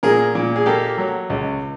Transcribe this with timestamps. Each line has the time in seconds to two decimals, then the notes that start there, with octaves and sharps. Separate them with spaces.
0.03 A#2 G#4 A#4
0.35 A#2
0.56 G#4
0.66 A#3 G4 A4
0.98 F#3
1.30 C#2